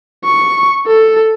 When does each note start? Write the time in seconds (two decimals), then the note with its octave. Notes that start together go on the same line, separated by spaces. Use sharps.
0.24 C#6
0.87 A4